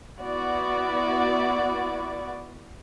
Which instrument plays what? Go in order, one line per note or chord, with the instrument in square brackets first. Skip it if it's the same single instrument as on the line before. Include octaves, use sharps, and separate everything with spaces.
[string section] B3 E4 F#4 D5